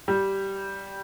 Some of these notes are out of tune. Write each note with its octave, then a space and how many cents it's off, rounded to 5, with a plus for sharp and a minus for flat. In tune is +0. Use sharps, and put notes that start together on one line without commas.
G3 -10